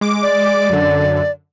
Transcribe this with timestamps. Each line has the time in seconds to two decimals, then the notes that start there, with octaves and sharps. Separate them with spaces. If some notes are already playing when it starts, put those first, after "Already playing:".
0.01 G#3 D6
0.22 D5
0.70 F#2 D3